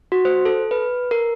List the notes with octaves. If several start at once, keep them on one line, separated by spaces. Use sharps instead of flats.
F#4
C5
A4
B4
A#4